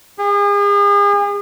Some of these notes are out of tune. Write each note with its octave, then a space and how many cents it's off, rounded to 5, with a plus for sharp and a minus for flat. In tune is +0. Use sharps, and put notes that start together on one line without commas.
G#4 -40